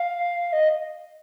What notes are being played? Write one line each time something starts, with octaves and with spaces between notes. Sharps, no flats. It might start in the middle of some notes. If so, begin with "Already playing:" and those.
Already playing: F5
D#5